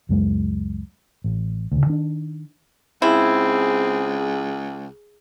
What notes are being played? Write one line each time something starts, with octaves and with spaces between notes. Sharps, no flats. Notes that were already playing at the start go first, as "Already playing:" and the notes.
C#2 F#2 G#3
A1
D2 C#3
D#3 D4
C#2 C4 E4 G#4